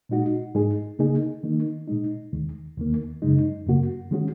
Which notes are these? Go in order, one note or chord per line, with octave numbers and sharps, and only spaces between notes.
A#2 G#3 D#4 F#4
G#2 G#3 D#4 G#4
C#3 A#3 D#4 G#4
D#3 A#3 D#4
A#2 G#3 D#4
D#2 D#3 G#3
D#2 D#3 A#3
F#2 C#3 G#3 D#4
F#2 C#3 A#3 F#4
D#3 G#3 C#4 F#4